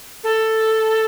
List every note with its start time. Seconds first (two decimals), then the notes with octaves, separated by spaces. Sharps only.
0.24 A4